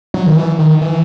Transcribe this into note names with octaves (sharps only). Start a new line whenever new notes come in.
F#3
D#3
E3
D#3
E3